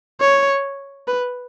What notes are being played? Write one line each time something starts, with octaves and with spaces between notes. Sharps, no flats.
C#5
B4